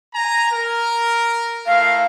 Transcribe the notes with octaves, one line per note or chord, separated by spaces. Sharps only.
G#5 A#5
A#4
A3 E4 A#4 F5